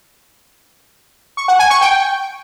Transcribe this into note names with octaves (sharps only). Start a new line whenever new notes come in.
C#6
F#5
G#5
C#6
G5